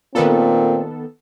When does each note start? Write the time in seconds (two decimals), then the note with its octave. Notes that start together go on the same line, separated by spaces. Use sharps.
0.15 A#2 D#3 B3 C4 A4